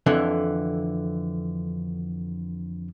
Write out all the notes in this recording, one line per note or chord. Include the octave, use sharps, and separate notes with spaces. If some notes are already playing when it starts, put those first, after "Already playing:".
F2 D3 E3